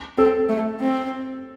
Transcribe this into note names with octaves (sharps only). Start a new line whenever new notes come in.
C4 A4
A3
C4